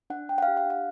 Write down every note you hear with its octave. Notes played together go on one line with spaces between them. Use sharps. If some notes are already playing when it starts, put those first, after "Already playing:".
D4 F#5
D4 G5
F#5
F5
G4
F5
D4 F#5